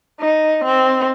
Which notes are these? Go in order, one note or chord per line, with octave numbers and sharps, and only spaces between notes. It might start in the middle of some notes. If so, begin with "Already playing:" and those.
D#4
C4